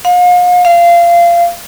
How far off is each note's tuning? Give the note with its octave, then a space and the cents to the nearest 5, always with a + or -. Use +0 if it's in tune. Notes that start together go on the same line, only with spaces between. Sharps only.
F5 +40
F5 -20